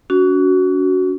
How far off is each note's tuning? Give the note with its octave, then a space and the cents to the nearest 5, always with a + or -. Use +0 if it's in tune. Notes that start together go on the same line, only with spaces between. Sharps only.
C#4 +40 F#4 +0